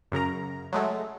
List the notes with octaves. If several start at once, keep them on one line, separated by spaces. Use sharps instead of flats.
F#2 C#3 A#4 A#5
F#3 G#3 A3